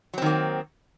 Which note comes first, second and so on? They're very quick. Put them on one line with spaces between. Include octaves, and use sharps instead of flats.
F#3 C4 D#3 A#3